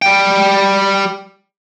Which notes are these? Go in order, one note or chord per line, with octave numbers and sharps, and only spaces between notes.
G3 G5